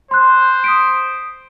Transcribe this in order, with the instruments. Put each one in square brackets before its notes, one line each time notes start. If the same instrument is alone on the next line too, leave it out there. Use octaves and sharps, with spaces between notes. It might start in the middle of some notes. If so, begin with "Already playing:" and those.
[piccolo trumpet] C5 [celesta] C6 F#6
[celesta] D#6 B6 D7